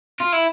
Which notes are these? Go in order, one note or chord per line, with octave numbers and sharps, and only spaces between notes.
F4
E4